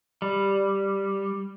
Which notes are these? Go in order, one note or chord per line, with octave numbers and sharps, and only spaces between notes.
G3